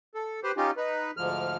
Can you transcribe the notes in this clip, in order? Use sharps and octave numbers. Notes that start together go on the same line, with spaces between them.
A4
G4 B4 C5
C#4 D#4 F4 G4
D#4 B4
D2 G#2 F3 F6